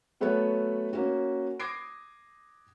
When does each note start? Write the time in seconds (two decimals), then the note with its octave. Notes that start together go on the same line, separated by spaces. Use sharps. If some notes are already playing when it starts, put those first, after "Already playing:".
0.20 F#3 A3 B3 A4 B4 C#5
0.93 A#3 C#4 F#4
1.60 D6 D#6 G#6 A#6 C7 D7